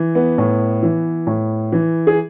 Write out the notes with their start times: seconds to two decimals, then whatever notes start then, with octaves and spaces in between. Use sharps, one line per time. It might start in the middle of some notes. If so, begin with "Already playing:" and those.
Already playing: E3
0.15 B3
0.38 A2
0.83 E3
1.27 A2
1.72 E3
2.07 G#4